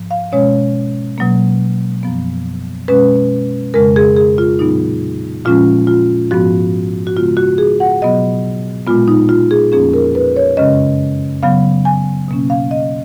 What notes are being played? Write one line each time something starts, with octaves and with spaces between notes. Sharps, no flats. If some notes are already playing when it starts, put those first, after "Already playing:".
Already playing: G#2 F3 B3
F5
B2 G#3 C#4 C#5
B2 F#3 A#3
F#2 F3 B3
B2 G#3 C#4 B4
F2 C#3 G#3 A#4
G#4
G#4
F4
A#2 F#3 B3 D#4
A#2 F3 G#3 C#4 F4
F4
G#2 F3 B3 F#4
F#4
C#3 G#3 B3 F4
F#4
G#4
F#5
B2 F#3 B3 D#5
A#2 G#3 B3 F4
D#4
F4
G#4
F2 F3 A#3 C#4 G#4
A#4
B4
C#5
F#2 C#3 G#3 C#4 D#5
C#3 F#3 B3 F5
G#5
B2 A#3 C#4
F5
D#5